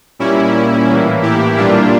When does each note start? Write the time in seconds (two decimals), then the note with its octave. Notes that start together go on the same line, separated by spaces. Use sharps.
0.19 A#2 G3 A#3 C#4 E4
0.88 A2 E3 A#3
1.22 E4 G4
1.57 A#2 G3 A#3 D4 F4